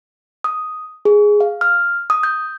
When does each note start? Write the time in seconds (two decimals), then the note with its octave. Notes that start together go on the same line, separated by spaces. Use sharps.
0.44 D#6
1.05 G#4
1.41 F5
1.61 F6
2.10 D#6
2.23 G6